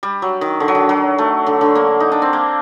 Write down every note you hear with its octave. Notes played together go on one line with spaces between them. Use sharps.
G3
F#3
D#3
D3
F#3
D#3
F#3
A3
D3
D3
A#3
D#4
D4
C4
A#3